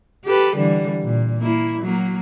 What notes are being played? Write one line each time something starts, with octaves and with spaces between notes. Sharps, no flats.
G4 A4 B4
D3 E3 G3
A#2
A#3 E4
F#3 A#3